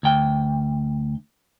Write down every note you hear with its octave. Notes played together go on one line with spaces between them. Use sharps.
D2 G5